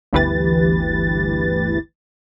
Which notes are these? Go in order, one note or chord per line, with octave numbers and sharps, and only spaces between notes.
G1 D2 E3 G4 B4 A6